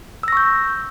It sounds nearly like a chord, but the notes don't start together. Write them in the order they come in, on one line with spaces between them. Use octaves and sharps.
E6 A#6 C#6 G6